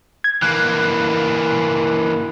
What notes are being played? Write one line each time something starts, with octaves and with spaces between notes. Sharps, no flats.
G#6
E3 A#3 F#6